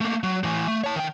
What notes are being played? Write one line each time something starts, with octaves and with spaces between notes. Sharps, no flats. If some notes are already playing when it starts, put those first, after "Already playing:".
A3 A#3
F#3
A2 E3
A3
C#5 A5
D#3 G5